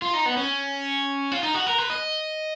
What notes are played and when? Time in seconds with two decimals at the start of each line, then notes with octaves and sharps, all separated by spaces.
0.02 F4
0.14 D#4
0.26 B3
0.37 C#4
1.32 F4
1.43 D#4
1.54 F#4
1.67 A#4
1.78 B4
1.90 D#5